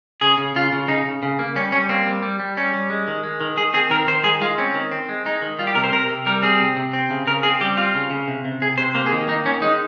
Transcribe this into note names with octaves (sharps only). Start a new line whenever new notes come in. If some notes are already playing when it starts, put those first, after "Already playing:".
C#3 G#4
C#3
C#3 F4
C#3
C#3 D#4
C#3
C#3
A#3
G3 C#4
G3 C#4
A#3 C4
G3
G3
G3
G3 C#4
G3
G#3
D#3
G#3
D#3
D#3 G#4
C4 G#4
D#3 A#4
D#3 C5
G#3 G#4
G#3 F4
C4 C#4
D#3
C4
G#3
G#3 D#4
D#3
G3 F4
G4
C3 A#4
C5
C3 A#4
C3
G3 A#4
C4 G#4
C3
C3
C4
C#3
C#3 A#4
C4 G#4
G3 G4
C4 F4
C#3
C#3
C3
C3
C3 G#4
C3 C5
A#3 C5
G#4
D#3
A#3 D#4
D#3 C#4
G#3 D#4